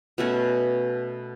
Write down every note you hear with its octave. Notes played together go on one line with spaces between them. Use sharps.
B2 A3 C#4 F#4